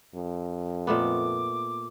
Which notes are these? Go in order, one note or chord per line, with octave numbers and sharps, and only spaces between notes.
F2
A#2 A3 B3 D6